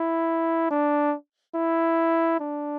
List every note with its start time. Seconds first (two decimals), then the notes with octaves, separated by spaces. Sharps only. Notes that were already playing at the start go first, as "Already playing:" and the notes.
Already playing: E4
0.71 D4
1.55 E4
2.40 D4